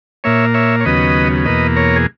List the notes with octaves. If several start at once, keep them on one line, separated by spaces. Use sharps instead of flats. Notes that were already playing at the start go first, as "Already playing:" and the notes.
A#2 A#3 C#5 E5
C#5 E5
C#5
D#2 C#3 F#3 B3 B4 D#5
E2 B2 A#3 B4 D#5
A#4 C#5
G#4